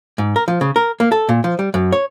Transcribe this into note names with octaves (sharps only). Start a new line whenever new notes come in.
G#2
A#4
F3
C#3
A#4
A#3
A4
A#2
F3
G3
F#2
C#5